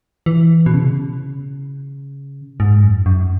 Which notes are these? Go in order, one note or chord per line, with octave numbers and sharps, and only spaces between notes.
E3
B2
C#3
G#2
F#2
F#2